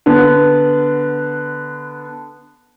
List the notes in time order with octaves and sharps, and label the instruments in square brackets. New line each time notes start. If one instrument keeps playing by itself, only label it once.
[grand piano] D3 B3